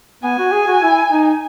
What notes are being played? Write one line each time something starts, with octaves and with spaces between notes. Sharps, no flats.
B3 G#5
F#4
G#4
F#4
E4
D#4